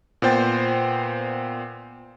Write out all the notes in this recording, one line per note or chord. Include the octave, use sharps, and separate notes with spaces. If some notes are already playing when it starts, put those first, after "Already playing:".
A#2 B3 C5 G5 A6